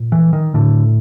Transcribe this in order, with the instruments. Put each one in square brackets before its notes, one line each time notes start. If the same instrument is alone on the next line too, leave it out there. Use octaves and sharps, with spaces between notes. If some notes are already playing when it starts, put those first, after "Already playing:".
Already playing: [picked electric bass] A#2
E3
D#3
A2 D3